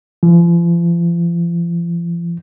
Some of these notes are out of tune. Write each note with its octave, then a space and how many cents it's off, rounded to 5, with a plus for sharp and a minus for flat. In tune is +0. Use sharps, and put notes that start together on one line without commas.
F3 -40